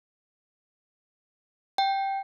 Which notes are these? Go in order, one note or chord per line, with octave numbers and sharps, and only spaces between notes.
G5